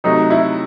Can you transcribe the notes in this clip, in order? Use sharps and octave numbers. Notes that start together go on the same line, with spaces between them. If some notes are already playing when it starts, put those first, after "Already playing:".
C3 F#3 A3 D#4
E4